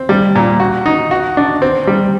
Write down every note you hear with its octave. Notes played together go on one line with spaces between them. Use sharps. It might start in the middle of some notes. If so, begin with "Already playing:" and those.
Already playing: C4
G3
A#2
F#4
D#4
F#4
D4
C4
G3